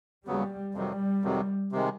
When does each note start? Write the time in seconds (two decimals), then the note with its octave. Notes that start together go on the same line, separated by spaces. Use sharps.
0.27 D#2 C#3 F#3 G3 B3
0.75 F2 C3 D#3 F#3 G3
1.23 F2 C3 D#3 F#3
1.72 C3 D#3 G#3